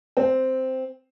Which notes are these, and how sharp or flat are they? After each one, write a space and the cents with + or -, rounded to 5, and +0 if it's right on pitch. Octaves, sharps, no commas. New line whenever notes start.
C4 -5